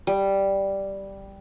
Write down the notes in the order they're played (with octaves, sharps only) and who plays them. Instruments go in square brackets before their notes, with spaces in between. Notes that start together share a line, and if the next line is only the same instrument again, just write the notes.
[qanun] G3